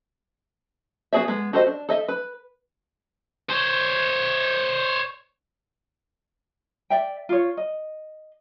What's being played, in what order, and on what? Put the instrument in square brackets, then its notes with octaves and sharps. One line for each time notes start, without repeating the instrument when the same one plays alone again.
[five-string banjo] B3 F#4 G#4 D5 E5
G#3 B3
F#4 G4 A4 C5 D#5
D4
A4 D#5 E5
B4
[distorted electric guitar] C5 C#5
[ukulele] D5 E5 G5
F4 C#5
D#5